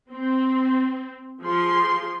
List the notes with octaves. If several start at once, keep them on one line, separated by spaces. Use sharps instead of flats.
C4
F3 G#4 C6